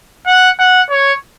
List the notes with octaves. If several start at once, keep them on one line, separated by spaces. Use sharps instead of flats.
F#5
F#5
C#5